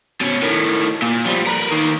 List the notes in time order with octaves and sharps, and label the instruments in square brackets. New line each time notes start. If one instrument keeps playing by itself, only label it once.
[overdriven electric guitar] B2 C#4
A2 D#3
A#2
F3 G3
A#4 B4
D#3 A#3